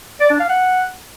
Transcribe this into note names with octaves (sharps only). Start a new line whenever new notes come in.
D5
D4
F5
F#5